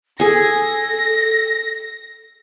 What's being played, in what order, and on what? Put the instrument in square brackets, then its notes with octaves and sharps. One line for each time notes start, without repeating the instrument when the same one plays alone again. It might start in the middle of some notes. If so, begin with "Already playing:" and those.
[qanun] G#4 G#5 [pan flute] A4 [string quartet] A#6